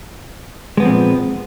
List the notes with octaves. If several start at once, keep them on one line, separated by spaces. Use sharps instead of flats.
A#2 F3 G#3 B3 C4